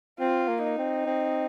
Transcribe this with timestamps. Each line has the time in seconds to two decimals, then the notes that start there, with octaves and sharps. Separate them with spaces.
0.20 C4 F4
0.48 A#3
0.63 D#4
0.78 C4
1.07 C4